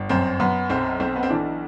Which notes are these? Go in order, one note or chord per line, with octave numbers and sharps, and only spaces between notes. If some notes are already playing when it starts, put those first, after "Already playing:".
Already playing: G1
F#2 C4
F#2 B3
B1 C4
B1 C4
B3
C4
E3 D4